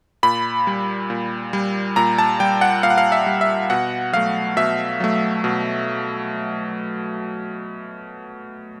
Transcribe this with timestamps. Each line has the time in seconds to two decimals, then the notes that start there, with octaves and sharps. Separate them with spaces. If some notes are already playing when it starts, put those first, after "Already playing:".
0.23 A#2 B5
0.67 G3
1.10 A#2
1.53 G3
1.96 A#2 A#5
2.18 A5
2.40 G3 G5
2.61 F#5
2.83 A#2 F5
2.90 F#5
2.98 F5
3.12 E5
3.26 G3
3.41 E5
3.70 B2 F#5
4.13 F#3 A3 F5
4.57 B2 E5
5.00 F#3 A3
5.44 B2